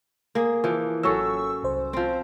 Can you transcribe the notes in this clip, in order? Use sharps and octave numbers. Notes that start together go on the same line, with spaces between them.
A#3 G#4
E3 F3
G#1 F#3 C#4 A4 C#6 E6
C2 C5
F3 C4